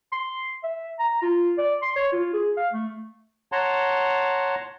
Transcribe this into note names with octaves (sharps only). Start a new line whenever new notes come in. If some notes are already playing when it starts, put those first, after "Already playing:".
C6
E5
A#5
F4
D5
C6
C#5
F4
G#4
F5
A3
C#5 F#5 A5 A#5 C6